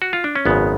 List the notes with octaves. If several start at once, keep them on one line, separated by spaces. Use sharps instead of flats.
F#4
F4
D4
C#4
G#1 F#2 C#3 G#3 B3